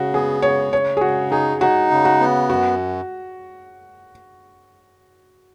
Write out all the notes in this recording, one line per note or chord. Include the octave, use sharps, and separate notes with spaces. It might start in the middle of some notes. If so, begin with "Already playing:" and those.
Already playing: C#3 F#4
B3 G#4
C#3 C#5
C#3 C#5
G#4
C#3 F#4
D#4 G#4
D#4 F#4
C#3
F#4
B3
F#2 F#4